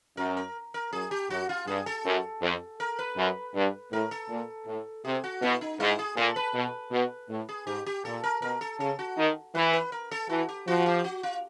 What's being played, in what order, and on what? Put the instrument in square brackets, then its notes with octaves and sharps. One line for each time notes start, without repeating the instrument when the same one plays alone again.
[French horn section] F#2 [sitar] A#4
[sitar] A#4
A#4
[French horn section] F#2 [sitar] G#4
[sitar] G4
[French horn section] F#2 [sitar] F#4
[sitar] F4
[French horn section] G2 [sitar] G#4
[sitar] A4
[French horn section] F#2
F2
[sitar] A#4
B4
[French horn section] F#2
G2
[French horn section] A2 [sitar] A#4
[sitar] A4
[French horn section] A#2
A2
[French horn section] C3 [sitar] G#4
[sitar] F#4
[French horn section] B2 [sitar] E4
[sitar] D#4
[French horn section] G#2 [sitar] E4
[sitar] G#4
[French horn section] A#2 [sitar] A4
[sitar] B4
[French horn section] B2
B2
A2
[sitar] G#4
[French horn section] G#2 [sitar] G4
[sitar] G4
[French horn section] A#2 [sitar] A4
[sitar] A#4
[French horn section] B2 [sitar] A#4
[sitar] A4
[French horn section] C#3 [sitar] A4
[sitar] F#4
[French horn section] D#3
[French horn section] E3 [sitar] B4
[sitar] B4
A#4
A4
[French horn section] E3 [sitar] F#4
[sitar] G4
[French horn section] F3 [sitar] F#4
[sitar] G4
F#4
F4